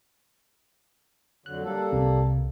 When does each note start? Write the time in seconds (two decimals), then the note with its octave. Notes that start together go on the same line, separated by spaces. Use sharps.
1.46 F2 D3 F#3 F#6
1.63 G3 A#3 A4
1.92 C2 C3